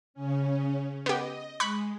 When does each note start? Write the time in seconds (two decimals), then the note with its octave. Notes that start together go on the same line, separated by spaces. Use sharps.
0.14 C#3 C#4
1.06 B3 G4 D#5
1.60 G#3 B5 C#6 F#6